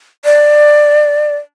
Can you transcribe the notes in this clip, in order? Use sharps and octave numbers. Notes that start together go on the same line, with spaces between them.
D5